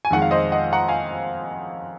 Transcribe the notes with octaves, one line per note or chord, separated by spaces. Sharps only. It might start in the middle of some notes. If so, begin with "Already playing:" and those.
G#5
F2 D#3 G#3 F#5
F5
C5 D#5
D#5 F#5
F#5 A#5
F5 G#5